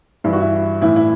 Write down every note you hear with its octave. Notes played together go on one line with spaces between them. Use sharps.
G2 E3 E4
F#4
E4
A2 E3 E4
E4